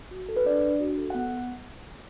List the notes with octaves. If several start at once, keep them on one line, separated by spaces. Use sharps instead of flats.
F#4
A4
B4
D4 D5
D4
F#4
A4
F#5
B3